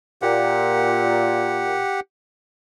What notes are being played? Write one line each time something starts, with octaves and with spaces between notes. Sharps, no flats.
A#2 G4 F#5